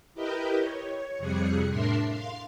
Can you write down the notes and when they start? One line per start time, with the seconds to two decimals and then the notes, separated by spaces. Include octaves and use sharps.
0.14 E4 G4 A#4 B4 D#5 G5
0.59 C#5
1.19 F2 C3 G3 G#4 F#6 C#7
1.69 A2 D4 A#4 E5 C6 C7
2.10 F5 C6